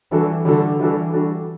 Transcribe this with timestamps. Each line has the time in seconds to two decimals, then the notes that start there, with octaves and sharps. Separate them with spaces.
0.11 E3 G3 D4 F#4 A4
0.45 D3 G3 D4 F#4 A4
0.79 E3 G3 D4 F#4 A4
1.13 G3 D4 F#4 A4